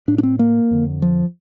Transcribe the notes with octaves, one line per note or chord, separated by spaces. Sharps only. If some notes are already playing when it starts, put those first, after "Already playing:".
A2 D4
D4
C4
A#3
F2 D3
F3